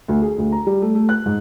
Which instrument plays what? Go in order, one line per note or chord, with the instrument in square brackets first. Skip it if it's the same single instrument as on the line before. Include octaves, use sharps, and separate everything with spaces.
[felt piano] D2
G#4
D2
A#5
G3
A3
A3
F#6
G#2